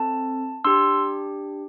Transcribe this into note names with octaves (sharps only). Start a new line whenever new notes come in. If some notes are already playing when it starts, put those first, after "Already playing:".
Already playing: C4 A4 A5
D4 G4 C6 E6